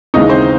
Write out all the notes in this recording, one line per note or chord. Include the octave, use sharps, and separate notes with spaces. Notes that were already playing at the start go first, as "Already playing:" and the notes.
D#2 C#3 E3 G#3 D#4
C4 C5